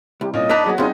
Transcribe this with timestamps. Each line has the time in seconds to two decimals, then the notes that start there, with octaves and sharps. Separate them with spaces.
0.21 C2 G4
0.34 A#2 C#4 D#5
0.50 A#3 D4 D#4 D5 A5 B5 F#6 B6
0.66 F#3 B3 F#4 G#4
0.78 G2 C3 F#3 B3 D#4 F4 G#4